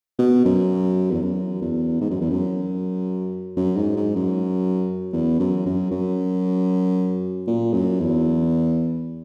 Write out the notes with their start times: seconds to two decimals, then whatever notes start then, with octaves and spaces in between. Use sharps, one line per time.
0.19 B2
0.45 F#2
1.11 E2
1.22 F#2
1.61 E2
2.01 G#2
2.11 F#2
2.21 E2
2.30 F#2
3.57 F#2
3.77 G#2
3.97 G#2
4.16 F#2
5.13 E2
5.40 F#2
5.66 F#2
5.91 F#2
7.47 A#2
7.74 F#2
8.00 E2